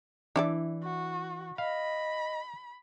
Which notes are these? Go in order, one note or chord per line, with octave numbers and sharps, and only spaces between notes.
E3 D4 E4 D5
F#4
D#5 F5 B5